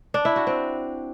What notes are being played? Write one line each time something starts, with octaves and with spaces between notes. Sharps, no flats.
D4
E4
F#4
C4